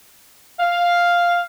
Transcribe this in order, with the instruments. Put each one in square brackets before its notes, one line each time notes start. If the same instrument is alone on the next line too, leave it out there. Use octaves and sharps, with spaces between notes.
[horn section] F5